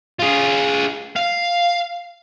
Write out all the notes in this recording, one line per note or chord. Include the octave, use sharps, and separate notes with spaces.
F4 G#4
F5